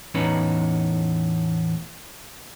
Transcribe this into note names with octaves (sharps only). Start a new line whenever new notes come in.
E2 A2 C#4 D#4 B4